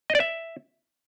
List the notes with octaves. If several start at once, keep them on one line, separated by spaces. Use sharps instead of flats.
D#5
D5
E5